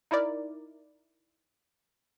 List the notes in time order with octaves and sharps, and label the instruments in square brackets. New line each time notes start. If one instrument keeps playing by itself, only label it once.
[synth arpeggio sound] D#4 E4 A#4 D5